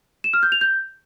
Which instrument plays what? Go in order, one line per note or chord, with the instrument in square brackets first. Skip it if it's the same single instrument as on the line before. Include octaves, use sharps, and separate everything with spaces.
[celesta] E7
F6
G6
F7
G6